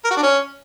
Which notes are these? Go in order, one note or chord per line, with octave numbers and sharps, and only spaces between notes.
A#4
F#4
D4
C#4